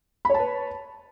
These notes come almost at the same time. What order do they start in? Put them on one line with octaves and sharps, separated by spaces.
B5 C#5 A5 B4